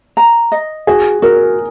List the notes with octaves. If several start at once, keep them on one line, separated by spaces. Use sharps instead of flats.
A#5
D#5
F#4 G#4
F#4 A#4